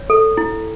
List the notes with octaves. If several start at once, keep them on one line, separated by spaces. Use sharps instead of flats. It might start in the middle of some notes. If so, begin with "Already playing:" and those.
Already playing: C#5
A4
E4